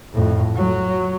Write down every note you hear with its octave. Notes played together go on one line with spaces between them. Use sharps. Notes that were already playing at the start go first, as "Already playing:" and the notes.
F2 A2
F#3